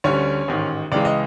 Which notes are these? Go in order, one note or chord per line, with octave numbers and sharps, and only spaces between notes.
D2 D3 G3 C#4 C#5
A1 G#2 D#3
C#2 C#3 E3 G#3 D5
D#5